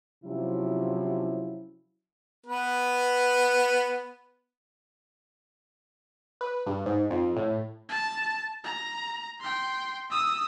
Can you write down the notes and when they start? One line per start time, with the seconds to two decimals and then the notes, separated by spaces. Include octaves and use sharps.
0.25 C3 F3 F#3 C#4 E4
2.46 B3 B4
6.41 B4
6.67 G2
6.86 G#2
7.11 F2
7.37 A2
7.89 A5
8.64 A#5
9.40 G5 C6
10.10 D#6 E6